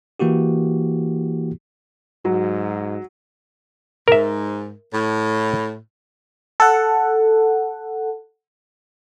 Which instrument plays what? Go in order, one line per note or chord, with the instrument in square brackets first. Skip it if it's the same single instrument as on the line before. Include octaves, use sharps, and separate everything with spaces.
[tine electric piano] E3 A#3 E4 F#4 G4
[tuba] G#2 [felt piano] F#3
[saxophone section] G#2 [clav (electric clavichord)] A#4 E5
[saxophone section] A2
[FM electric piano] A4 F#5